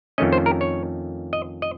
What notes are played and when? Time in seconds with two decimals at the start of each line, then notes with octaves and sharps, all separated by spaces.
0.18 F2 D#3 A3 C#4 D#5
0.33 C5
0.46 A#4
0.61 C#5
1.33 D#5
1.62 D#5